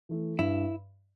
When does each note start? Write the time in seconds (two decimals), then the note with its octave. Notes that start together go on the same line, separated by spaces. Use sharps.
0.09 E3 A3 E4
0.39 G2 E4